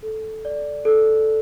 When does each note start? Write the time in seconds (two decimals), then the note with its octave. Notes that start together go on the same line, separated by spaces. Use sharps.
0.03 A4
0.45 D5
0.85 A4